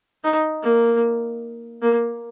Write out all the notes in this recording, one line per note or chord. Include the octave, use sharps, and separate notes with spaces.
D#4
A#3
A#3